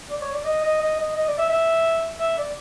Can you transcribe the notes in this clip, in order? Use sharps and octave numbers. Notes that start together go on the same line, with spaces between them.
D5
C#5
D5
D#5
D#5
D#5
D#5
D#5
D5
E5
E5
E5
D5